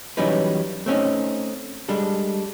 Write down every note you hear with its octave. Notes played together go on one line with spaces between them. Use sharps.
E3 F#3 G3 C#4 D#4 B4
A3 C4 C#4 D#4
G3 G#3 D4 A4